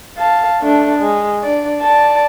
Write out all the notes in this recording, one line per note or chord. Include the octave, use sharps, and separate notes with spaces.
F5 A5
A3 D4
G#3
D4 D5
D5 A5